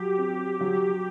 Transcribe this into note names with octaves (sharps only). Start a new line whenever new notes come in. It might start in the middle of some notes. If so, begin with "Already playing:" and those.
Already playing: F#3 G4
C4
F#3